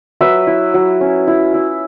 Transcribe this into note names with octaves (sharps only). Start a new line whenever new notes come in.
F#3 B4 E5
E4
F#3
C#4
E4
E4